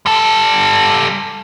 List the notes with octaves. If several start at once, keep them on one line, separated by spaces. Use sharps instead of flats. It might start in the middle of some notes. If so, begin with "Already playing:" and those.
G3 A4